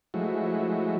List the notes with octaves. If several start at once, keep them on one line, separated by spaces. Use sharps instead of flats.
F3 F#3 G#3 A3 E4 F#4